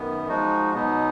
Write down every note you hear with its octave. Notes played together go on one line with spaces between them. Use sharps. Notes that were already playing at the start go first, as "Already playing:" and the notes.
Already playing: F#2 D#3 B3
F3 G#3 D#4 F#4
B2 F#3 B3 D#4